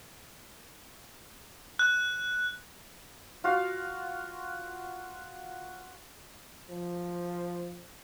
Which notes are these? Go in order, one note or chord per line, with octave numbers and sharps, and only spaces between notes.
F#6
F4 F#4 F5
F3